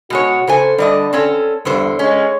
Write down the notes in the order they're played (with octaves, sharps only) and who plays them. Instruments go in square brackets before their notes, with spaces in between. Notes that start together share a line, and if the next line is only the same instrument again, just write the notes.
[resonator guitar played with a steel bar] B2 G#3 C#5 [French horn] F#4
[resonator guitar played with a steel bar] C#3 A4 G#5 [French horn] C5
[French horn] D3 [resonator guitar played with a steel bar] G3 D5 D#5
[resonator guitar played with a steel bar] C4 C#4 A4
[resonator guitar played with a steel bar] E2 D3 C5 [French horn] G2
[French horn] G#3 [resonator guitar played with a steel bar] C#4 [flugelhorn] C#5